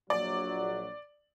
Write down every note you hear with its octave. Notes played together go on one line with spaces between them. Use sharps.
A#1 F#3 D5